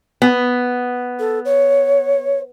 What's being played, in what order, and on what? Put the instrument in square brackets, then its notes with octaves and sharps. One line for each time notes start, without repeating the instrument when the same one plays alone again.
[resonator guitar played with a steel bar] B3
[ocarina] A4
C#5